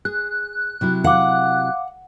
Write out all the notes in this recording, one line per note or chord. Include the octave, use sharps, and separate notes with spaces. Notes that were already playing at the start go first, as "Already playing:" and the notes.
G#4 F#6
C3 F#3 E4
F5 F#5 D6